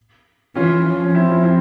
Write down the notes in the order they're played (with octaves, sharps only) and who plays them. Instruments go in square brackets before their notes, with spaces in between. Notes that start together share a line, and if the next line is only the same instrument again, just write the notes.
[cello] E3 [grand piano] C#4 F4
[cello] F3
[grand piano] C#4
[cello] F3 [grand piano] C4 E4
[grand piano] C#4 F4
C4 E4